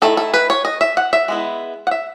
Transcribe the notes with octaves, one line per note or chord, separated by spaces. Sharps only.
D#3 A3 E4 A4
A4
B4
C#5
D#5
E5
F#5
E5
G#3 B3 E4
F#5
E5